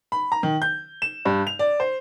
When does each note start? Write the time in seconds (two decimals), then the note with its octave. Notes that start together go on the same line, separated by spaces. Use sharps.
0.12 B5
0.32 A#5
0.43 D#3
0.62 G6
1.02 E7
1.25 G2
1.47 F7
1.59 D5
1.80 C5